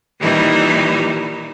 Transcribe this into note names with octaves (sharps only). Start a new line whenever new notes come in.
A#2 D#3 E3 G3 D#4 E4